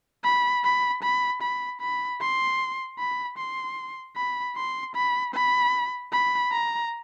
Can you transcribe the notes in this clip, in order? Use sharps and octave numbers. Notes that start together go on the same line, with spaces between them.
B5
B5
B5
B5
B5
C6
B5
C6
B5
C6
B5
B5
B5
A#5